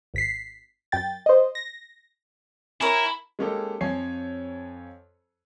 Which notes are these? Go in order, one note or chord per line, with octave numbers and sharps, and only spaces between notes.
G#1 B6 C7
F#2 G5 A6
C5 D#5
A#6
E4 A#4 C#5 G#5
G#3 A#3 C#4 D#4 G4 A4
F2 F3 C#5 G#5 C7